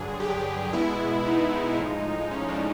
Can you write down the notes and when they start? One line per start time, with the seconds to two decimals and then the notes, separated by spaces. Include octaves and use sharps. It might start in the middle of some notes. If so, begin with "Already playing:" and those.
Already playing: G2 D3 F#3 G#4
0.20 G4
0.73 B2 G#3 B3 E4
1.26 D#4
1.78 A2 F3 G#3
2.31 C#4
2.49 D4